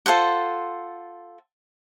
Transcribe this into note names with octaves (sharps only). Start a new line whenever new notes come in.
F4 A4 C5 F#5